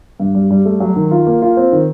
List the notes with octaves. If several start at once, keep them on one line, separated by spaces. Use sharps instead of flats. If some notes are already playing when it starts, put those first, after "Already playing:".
G2
G3
G3
A3
F#3
D#3
F4
A#3
F4
C4
D#3